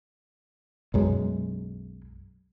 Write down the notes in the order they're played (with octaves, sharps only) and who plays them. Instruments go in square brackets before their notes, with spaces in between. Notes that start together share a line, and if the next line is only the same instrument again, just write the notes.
[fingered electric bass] B1 F#2 G#3